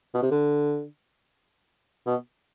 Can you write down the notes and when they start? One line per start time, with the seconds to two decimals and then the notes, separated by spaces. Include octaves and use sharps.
0.14 B2
0.23 C3
0.31 D3
2.06 B2